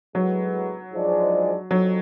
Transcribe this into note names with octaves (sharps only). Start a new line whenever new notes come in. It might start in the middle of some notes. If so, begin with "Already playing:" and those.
A2 F#3 G#3 B3 F#4 B4
G#2 F3 G#3 D4 G#4
F2 F#3